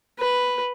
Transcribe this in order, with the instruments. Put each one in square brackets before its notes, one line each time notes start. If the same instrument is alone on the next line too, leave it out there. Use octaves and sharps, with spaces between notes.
[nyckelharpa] B4